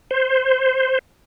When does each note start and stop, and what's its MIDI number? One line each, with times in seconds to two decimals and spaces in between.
0.11 0.99 72